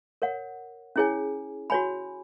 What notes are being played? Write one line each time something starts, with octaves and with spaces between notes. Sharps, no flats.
A#4 C#5 F#5
C#4 E4 G#4 C#5 G#5
F#4 C#5 G#5 B5